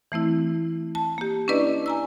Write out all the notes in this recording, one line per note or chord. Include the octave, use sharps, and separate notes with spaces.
E3 A3 C4 E4
A5
A#3 G4
C#4 D4 E4 B4 D5 D#5
G#5 A#5 E6